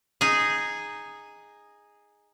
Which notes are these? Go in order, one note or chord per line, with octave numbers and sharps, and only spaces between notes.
D#4 G#4